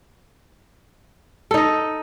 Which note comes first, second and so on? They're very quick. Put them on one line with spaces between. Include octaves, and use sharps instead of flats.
A4 D#4 D#5